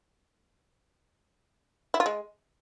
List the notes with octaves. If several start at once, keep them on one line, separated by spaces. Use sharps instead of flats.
E4
F4
G#3